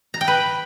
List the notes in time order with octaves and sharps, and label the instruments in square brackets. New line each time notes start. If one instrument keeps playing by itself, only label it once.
[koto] A#5
G5
B4